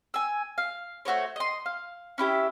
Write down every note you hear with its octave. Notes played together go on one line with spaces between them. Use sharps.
G#5 E6
F5
A3 F#4 C5 C#5
D#5 C6
F5
C#4 E4 G4 E5